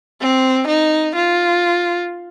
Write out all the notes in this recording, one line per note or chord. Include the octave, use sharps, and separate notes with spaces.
C4
D#4
F4